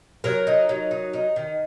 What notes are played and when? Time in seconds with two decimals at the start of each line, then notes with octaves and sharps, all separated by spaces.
0.24 F#3 A#4
0.47 D#4
0.69 F#3
0.91 D#4
1.13 D#4
1.36 D#3